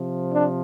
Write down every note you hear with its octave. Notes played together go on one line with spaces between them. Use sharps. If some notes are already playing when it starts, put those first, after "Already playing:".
Already playing: C3 F3
D4